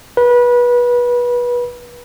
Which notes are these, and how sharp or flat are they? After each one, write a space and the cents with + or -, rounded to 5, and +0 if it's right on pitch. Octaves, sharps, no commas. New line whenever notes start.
B4 -25